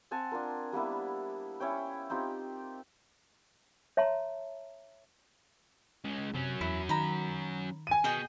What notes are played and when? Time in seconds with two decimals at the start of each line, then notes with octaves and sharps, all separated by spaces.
0.11 C4 F#5 G#5 A5
0.31 D4 F4 A#4
0.73 G3 A#3 B3 E4
1.60 C#4 E4 C#5 G5
2.10 C4 D#4 F4 G4
3.97 C#5 E5 A5 A#5 C6
6.04 C#2 G#3
6.34 C3 F#3 C#4
6.61 E2 E4
6.89 D#3 A#5 B5
7.87 G#5 D#7
8.04 B2 G#4 D#5 G5